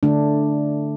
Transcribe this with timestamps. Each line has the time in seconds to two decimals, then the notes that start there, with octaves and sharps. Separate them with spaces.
0.03 D3 A3 D4